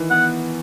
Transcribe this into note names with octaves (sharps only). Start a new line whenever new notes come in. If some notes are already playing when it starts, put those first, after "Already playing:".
Already playing: D#3 E3
B3 F#5